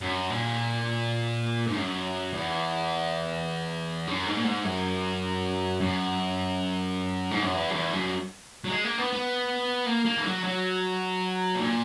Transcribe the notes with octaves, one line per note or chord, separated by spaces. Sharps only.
F#2
A#2
G#2
F#2
E2
F#2
G#2
A#2
G#2
F#2
F#2
G#2
F#2
E2
F#2
E2
F#2
F#3
G#3
A#3
B3
B3
A#3
A#3
E3
F#3
F#3
B2
A#2